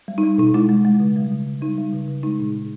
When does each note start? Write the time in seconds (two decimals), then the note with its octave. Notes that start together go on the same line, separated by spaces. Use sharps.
0.08 G3
0.18 D#4
0.23 G3
0.38 B2 D#4
0.54 G#3 E4
0.69 G#3
0.85 G#3
1.00 C#3
1.16 G3
1.32 C#3
1.47 C#3
1.62 G3 D#4
1.78 G3
1.93 C#3
2.08 C#3
2.23 G#3 D#4
2.40 A#2
2.55 A#2